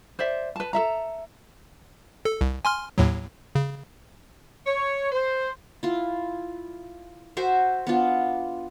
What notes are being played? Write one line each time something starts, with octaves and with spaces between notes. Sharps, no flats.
C5 D5 E5
B4 A5
A4 E5 A#5
A4
C2
G#5 C6 F6
D#2 A2 F#3
C#3
C#5
C5
E4 F4
F#4 C5 E5 G#5
B3 D4 F4